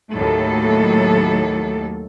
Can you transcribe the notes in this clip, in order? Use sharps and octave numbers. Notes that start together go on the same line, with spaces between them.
D#2 A2 F#3 A4